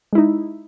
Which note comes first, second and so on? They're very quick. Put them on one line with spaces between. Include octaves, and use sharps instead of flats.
G#3 E4 D#4